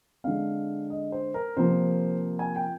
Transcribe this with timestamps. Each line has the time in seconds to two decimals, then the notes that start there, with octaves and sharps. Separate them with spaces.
0.24 D3 G#3 C4 F5
0.90 D#5
1.12 C5
1.34 A#4
1.57 C3 F3 A#3 C5
2.39 G#5
2.56 G5